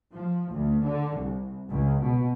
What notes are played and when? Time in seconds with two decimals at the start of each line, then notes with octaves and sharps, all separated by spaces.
0.12 F3
0.52 D2
0.84 D3
1.18 C2
1.70 C#2
2.02 B2